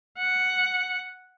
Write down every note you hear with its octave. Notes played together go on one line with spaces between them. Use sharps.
F#5